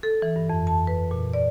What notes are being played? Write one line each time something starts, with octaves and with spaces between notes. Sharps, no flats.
A4
E3
G2
F2
A5
B4
A#2
D5